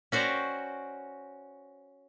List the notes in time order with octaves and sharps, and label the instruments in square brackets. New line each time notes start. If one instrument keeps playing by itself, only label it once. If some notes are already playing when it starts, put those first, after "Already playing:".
[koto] C#4 F#4 C5 D5 G5 A#5